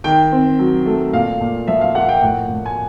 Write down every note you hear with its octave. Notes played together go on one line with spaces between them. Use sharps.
D#3 G5
C4
F#3
A3
A#2 F5
A#2
F3 E5
F5
A#3 F#5
G5
A2 F#5
A2
G#5